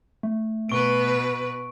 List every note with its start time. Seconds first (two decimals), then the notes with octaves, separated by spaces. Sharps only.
0.23 A3
0.69 B2 B4 C#6 D7